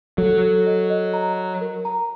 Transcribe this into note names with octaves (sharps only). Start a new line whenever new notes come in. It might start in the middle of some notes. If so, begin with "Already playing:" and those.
F#3 A4
A4
D#5
D#5
A#5
A#5
A#4
A#5